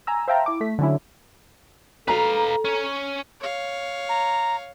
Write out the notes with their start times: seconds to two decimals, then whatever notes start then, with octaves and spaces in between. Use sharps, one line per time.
0.07 G#5 A#5 E6
0.28 C5 E5 F5 G5 A5 A#5
0.46 E4 D6
0.61 A3 B6
0.79 D3 F#3 C#4 E4
2.08 A4 B4 F5 A#5
2.65 C#4 C#5
3.40 C#5 F5
4.09 A#5